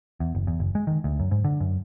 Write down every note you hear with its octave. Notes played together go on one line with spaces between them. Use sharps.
E2
F#1
E2
F#1
G#3
D#3
D2
F#2
G#2
D3
F#2